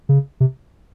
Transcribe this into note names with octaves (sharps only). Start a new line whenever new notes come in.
C#3
C3